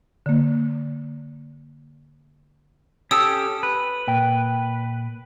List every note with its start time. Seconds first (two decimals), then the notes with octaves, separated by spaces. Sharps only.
0.26 D3 A#3
3.11 C#4 G4 A4 D#6 E6
3.63 B4
4.07 A#2 G5 B5